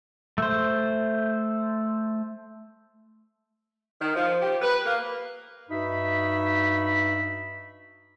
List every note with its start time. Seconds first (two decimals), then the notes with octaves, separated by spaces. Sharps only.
0.38 A3 C5
4.00 D#3
4.15 F3
4.41 G4
4.62 B4
4.85 A#3
5.70 G2 D#4 F#4 E5 B5